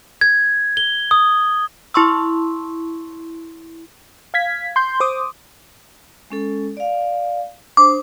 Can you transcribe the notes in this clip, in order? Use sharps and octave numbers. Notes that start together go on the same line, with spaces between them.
G#6
G7
D#6
E4 C6 C#6 E6
F5 G#6 B6
C6 G6
C5 D6 D#6
G#3 C#4 A4
D5 F5
D4 C5 D6 D#6